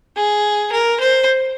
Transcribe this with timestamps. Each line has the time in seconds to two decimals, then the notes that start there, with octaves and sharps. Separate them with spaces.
0.16 G#4
0.72 A#4
1.00 C5